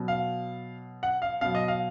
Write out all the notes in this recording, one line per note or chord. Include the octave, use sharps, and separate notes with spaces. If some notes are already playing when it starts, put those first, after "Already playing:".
Already playing: B2 F#3
F5
F#5
F5
B2 F#3 F5
D#5
F5